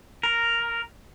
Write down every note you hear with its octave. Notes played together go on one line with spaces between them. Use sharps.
A#4